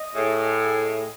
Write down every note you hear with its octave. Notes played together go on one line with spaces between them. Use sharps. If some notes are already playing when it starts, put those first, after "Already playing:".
Already playing: D#5
A2 G#4
G#5
G#4
D#5